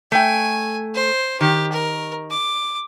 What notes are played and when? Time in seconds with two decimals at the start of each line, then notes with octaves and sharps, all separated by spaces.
0.12 A3 G5 G#5
0.95 C5
1.41 D#3 G4
1.72 A#4
2.30 D6